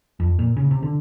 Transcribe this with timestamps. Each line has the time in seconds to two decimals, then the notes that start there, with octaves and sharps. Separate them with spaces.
0.20 F2
0.39 A#2
0.57 C#3
0.71 C3
0.83 D3